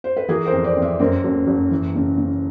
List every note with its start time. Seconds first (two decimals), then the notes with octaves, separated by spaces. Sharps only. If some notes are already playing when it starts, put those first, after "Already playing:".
0.04 C5
0.17 B4
0.28 E3 G#4 A#4
0.46 A#4 C5
0.52 F2
0.64 C5 D5
0.76 F2
0.82 D5 E5
0.99 F#2 A#4 C5
1.24 F#1
1.47 F#1
1.71 E3
1.95 C#3
2.18 C#3